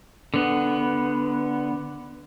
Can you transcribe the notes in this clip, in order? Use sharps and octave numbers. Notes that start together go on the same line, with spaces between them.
D3 B3